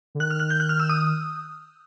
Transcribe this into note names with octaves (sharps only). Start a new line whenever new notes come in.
D3
D#3 F#6
F6
F#6
G6
F#6
F6
E6
D#6